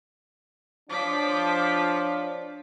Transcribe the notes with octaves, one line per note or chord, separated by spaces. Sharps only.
F3 D4 C#5 D6 B6